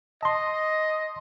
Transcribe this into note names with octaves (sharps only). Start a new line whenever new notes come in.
D#5 A5 C6